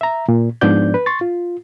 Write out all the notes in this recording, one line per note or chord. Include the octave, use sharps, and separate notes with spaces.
E5 A#5
A#2
G#2 F3 B3 D4 D5 G6
B4
C6 C#6 A6
F4